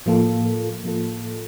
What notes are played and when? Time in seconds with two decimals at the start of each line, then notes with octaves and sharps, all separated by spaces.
0.06 A2 F3 A#3 F4 A4
0.84 A2 F3 A#3 F4 A4